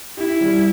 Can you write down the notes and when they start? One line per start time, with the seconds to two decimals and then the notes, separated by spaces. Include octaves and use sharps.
0.17 E4 G4
0.41 G3